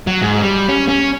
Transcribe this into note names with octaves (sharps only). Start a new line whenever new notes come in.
F#3
G#2
G3
C#4
C#4